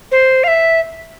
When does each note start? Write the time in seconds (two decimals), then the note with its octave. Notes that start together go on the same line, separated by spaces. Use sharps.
0.12 C5
0.44 F5
0.48 E5